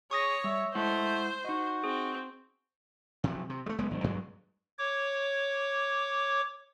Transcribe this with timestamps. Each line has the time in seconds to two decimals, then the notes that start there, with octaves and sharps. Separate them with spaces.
0.11 G#4 C#5 C#6 D#6 A#6
0.44 G3 E5
0.75 G#3 A3 E4 C5 F#5
1.45 D#4 F#4 D#5
1.84 C4 G#4
3.24 C3 F3 F#3
3.50 C3
3.66 G3 A3
3.78 F#1 G#3 B3
3.91 F#1
4.04 G2 F#3 G#3
4.78 C#5 D6